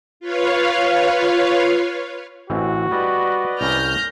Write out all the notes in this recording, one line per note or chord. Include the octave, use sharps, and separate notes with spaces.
F4 B4 C#5 F5
A1 E3 C4 F#4
G3 B4 D5 D#5
C2 C#4 A#5 F6 G6 A#6